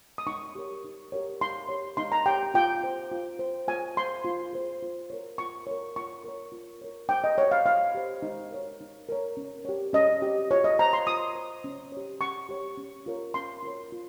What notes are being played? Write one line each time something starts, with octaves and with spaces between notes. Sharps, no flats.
D#6
D#4 C#6
G4 A#4 C#5
D#4
G4 A#4 C#5
D#4 C6
G4 C#5
D#4 C6
A#5
G4 C#5 G5
F4 G5
C5
F4
C5
F4 G#5
G#4 C5 C6
F4
G#4 C5
F4
A#4 C#5
F4 C#6
A#4 C#5
F4 C#6
A#4 C#5
F4
A#4 C#5
D#4 G5
D#5
G4 C5 C#5
F5
D#4 F5
G4 C5
D#4
A#4 C#5
D#4
A#4 C#5
C#4
G4 C#5
C#4 D#5
G4 C#5
F4 C#5
D#5
C5 A#5
C6
F4 D#6
C5
C#4
G4 C#5
C#4 C#6
G4 C#5
C#4
F4 A#4 C#5
C#4 C6
F4 A#4 C#5
F4